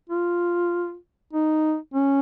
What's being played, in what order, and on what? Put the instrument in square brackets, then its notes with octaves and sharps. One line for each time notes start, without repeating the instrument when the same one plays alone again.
[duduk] F4
D#4
C#4